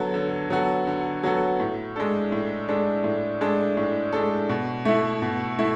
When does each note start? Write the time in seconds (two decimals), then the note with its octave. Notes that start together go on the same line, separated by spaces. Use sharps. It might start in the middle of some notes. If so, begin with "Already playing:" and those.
Already playing: D3 F#3 B3 F#4 A4
0.14 D3
0.50 F#3 B3 F#4 A4
0.87 D3
1.23 F#3 B3 F#4 A4
1.60 A2
1.96 G#3 D4 A4
2.32 A2
2.69 G#3 D4 A4
3.04 A2
3.41 G#3 D4 A4
3.77 A2
4.13 G#3 D4 A4
4.49 B2
4.85 A3 E4
5.22 B2
5.59 A3 E4